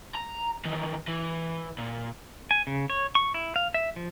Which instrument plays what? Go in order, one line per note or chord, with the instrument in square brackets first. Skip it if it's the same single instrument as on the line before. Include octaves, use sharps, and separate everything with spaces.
[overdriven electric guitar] A#5
D#3 E3
E3
A#2
[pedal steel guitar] G#5
C#3
C#5
C#6
E4
F5
E5
F3